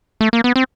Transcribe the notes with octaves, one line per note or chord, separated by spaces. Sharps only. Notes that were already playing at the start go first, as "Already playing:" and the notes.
A3
A#3
B3
C4